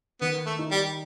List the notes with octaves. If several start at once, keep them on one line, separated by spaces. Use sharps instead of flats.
D#3 B3
A3
D#4
G3